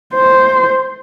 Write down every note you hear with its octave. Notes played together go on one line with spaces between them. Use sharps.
C5